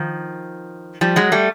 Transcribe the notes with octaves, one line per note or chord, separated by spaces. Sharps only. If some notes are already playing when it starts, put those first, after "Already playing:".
Already playing: D#3 F3
F3 G3
F#3 G#3
G3 A3